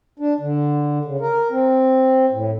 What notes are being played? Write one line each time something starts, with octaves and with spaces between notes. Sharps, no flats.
D4
D3
C#3
A#4
C4
A2